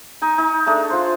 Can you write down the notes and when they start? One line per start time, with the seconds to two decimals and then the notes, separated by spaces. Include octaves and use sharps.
0.22 D#4 G#5
0.38 D#4
0.66 A3 D4 G#4
0.90 F4 C5